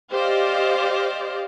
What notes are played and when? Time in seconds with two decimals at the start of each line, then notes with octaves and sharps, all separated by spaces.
0.12 G4 C5 D5 D#5 F5